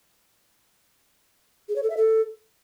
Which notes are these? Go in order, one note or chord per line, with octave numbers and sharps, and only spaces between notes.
G#4
C#5
A4
E5
A4